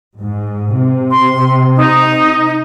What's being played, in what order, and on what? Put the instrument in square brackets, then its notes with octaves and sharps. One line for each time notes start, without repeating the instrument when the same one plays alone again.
[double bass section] G#2
C3
[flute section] C6
D#4